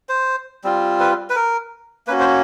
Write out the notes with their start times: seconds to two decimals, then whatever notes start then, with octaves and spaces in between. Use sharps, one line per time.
0.09 C5
0.64 G3 C4 F4
1.00 B4
1.30 B4
1.36 A#4
2.07 A#3 C#4 F#4 B4
2.20 C5